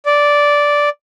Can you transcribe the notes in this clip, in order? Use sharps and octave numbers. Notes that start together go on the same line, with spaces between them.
D5